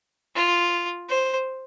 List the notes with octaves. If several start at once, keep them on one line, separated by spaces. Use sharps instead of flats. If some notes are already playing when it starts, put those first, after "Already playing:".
F4
C5